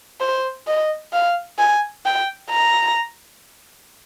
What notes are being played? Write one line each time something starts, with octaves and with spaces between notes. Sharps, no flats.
C5
D#5
F5
G#5
G5
A#5